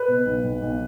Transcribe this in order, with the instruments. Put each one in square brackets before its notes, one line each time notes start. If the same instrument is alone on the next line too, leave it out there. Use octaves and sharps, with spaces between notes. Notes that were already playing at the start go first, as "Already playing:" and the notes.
Already playing: [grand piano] B4
[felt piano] B2
B1
B1
B1